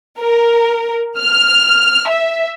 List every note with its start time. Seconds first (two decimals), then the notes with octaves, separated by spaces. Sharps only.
0.20 A#4
1.19 F6
2.08 E5